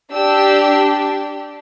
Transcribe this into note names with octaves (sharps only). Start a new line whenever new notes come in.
D4 G4 E6